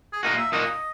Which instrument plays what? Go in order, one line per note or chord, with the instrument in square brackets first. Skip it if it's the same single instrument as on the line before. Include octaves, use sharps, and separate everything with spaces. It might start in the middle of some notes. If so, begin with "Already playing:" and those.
[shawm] G#4
[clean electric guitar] A#2 A#3 D#4 F#4 [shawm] A#4
[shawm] E5
[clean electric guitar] A#2 A#3 D#4 F#4 [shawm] D#5